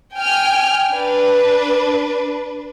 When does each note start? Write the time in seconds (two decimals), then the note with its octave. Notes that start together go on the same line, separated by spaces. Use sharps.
0.16 G5 G#5 F6
0.93 D4 B4